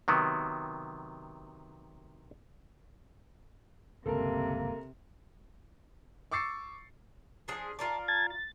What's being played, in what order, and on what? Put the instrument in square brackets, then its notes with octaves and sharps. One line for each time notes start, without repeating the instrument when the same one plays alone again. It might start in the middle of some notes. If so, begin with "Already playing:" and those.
[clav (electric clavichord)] C3 D#3 F#3 B3
[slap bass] G1 C#2 G2 [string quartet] C3 [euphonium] A#3 [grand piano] A4 A#4
[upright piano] C#6 D6 E6 A6 C7 C#7
[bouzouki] F3 D4 G#4
[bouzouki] F4 A#4 D5 [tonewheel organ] A5
[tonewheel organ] A5 G#6 A6
A6